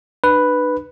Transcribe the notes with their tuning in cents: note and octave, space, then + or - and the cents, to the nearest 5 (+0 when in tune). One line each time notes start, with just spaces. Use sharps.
D4 +40 B4 +0